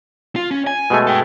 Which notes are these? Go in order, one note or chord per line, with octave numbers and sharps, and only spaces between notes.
F4
C#4
G#5
B2 G#3 A3
A4 G5